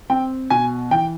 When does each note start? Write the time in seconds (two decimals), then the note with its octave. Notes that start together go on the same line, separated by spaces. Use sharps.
0.10 C4 G5
0.50 B2 G#5
0.91 E3 G5